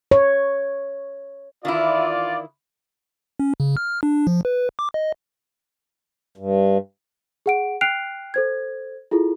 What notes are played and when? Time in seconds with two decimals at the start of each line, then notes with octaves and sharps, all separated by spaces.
0.11 C#5
1.65 D#3 E3 E4 F4 D5
3.40 C#4
3.60 C#3
3.77 F6
4.03 D4
4.27 F3
4.45 B4
4.79 D6
4.94 D#5
6.38 G2
7.46 G#4 F#5 D7
7.81 G5 F6 F#6 C7 D7 F7
8.34 A4 C5 G#6
9.11 E4 F4 G#4 A4